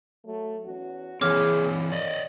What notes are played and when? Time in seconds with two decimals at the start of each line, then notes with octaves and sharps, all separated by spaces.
0.25 F#3 A3
0.64 E2 C#4 F#4
1.21 E3 C4 G#4 C#5 D6 F6
1.92 D#3 D5 D#5